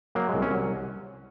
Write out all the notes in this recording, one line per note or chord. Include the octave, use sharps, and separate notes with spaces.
F#3 A#3
C2 G#3
C#4
F#3